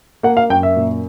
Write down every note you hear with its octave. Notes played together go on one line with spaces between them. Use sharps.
A#3 F#5
F5
F#2 G5
E5
A#2